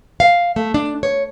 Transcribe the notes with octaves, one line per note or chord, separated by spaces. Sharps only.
F5
A3
D4
C#5